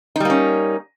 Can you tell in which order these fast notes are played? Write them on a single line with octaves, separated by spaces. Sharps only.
D#4 G3 A#3 C#4